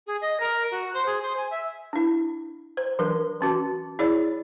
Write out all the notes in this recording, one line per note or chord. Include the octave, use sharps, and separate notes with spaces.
G#4
D#5
A#4
F#4
C5
G#4
C5
G#5
E5
D4 E4
C5
E3 F#3 D4 A#4
E3 C#4 F#4
E4 G#4 C#5 D5